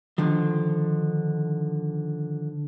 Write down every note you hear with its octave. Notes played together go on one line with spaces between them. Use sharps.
D3 D#3 F3